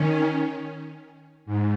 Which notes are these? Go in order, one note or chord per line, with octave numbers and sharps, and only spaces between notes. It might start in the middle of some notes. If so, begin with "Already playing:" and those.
Already playing: D#3 C#4
G#2